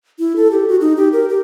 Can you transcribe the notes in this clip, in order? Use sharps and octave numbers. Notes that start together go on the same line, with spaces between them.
E4
A4
G4
F#4
D#4
G4
A#4
G4